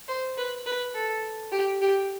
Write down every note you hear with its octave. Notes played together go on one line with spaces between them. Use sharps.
C5
B4
B4
A4
G4
G4